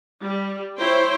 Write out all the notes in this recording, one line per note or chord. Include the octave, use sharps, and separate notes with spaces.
G3
E4 C5 C#5 G5 C6